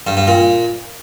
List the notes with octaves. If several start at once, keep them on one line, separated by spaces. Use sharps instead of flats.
G2
G2
A#2